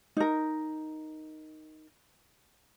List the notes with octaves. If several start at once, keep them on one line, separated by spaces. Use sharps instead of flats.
D#4 A#4